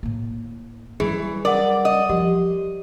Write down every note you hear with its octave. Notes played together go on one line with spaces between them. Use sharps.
A2 A#3
E3 F#3 G3 G#4
A#4 D5 F#5
D#5
F3 G4